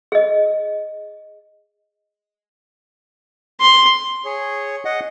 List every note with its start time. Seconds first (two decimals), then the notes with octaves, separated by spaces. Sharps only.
0.12 G#4 D#5
3.61 C6
4.25 G#4 C#5
4.85 D#5 F#5